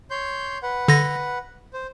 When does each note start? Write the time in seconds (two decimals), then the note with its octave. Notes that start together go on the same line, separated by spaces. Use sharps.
0.11 C#5 C6 G6
0.63 B4 F#5
0.88 D3 A#6
1.73 C5